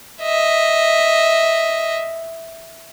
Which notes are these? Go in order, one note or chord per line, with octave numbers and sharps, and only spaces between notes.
D#5 E5